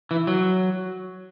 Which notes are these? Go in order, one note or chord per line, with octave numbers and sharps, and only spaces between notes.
E3
F#3